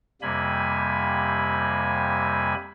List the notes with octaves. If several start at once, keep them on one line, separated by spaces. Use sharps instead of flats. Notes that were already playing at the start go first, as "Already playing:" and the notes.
F2 C3 G3 A#3 G#5 B5